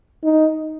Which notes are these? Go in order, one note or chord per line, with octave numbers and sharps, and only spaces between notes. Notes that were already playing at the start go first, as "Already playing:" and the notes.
D#4